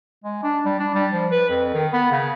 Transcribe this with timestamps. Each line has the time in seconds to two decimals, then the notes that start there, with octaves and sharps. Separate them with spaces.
0.24 G#3
0.43 D4
0.65 G3
0.79 D4
0.95 G3
1.13 F3
1.31 B4
1.50 F2
1.74 D#3
1.93 B3
2.11 C#3